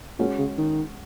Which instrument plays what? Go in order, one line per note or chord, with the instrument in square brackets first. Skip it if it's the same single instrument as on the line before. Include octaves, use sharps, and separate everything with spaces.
[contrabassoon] A#2 [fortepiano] G#3 C#4 F#4
[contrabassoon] C#3
D#3